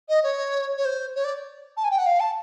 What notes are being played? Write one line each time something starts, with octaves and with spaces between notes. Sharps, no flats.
D#5
C#5
C#5
C5
C#5
D5
A5
G#5
G5
F#5
F5
A5